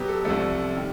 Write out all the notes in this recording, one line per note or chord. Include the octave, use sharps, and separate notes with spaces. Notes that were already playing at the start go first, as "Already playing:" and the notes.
Already playing: B2 F#3 B3 G4
A4
C2 C3 F3 A3 A4
D#3 G3